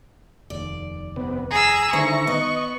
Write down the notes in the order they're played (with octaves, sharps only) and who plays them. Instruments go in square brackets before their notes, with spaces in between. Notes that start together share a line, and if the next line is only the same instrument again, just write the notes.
[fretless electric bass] F1 D#2 [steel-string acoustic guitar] D5
[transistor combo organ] C3 B3
[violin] G#4 E6 [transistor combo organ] A#5
[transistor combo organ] D3 E5 A#5 [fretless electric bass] D#3 [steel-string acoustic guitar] E4 C5 [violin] C#6
[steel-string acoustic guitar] B3 [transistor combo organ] D#5